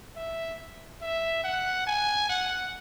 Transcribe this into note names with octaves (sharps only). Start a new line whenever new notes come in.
E5
E5
F#5
G#5
F#5